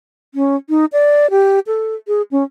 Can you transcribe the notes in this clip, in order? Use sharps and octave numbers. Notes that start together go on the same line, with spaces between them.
C#4
D#4
D5
G4
A4
G#4
C#4